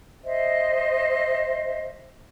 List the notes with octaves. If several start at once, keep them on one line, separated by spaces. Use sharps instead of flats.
C5 D#5 E5